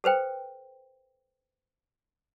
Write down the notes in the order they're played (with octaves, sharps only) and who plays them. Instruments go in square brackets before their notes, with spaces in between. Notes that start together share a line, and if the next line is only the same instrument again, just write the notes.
[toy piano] A4 B4 C5 G5